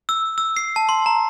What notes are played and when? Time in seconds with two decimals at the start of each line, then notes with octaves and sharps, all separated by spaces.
0.09 E6
0.38 E6
0.57 C7
0.76 A5
0.89 C6
1.06 A#5